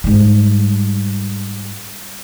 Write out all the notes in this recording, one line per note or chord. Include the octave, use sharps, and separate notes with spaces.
G#2 G3